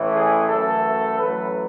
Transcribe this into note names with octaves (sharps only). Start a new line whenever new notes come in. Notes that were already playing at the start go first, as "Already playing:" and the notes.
Already playing: A1 A2 E3 A3
G#4
F#2 E3 A3 A4
A1 A2 F#3 B4